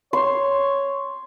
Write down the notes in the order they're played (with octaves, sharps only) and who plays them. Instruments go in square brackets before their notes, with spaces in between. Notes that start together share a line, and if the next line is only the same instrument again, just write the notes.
[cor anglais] C#5 [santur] C6